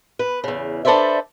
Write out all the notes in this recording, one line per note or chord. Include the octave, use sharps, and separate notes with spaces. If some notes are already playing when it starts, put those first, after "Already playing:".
B4
E2 C#3
D4 A4 B4 C5 D5 E5